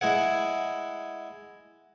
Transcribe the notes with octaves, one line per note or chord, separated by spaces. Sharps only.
G#3 E4 G#4 F#5